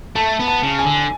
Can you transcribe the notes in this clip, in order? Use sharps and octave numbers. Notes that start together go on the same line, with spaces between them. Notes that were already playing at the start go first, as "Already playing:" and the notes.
A3 A5
B3
A5
C#3
G#5
D3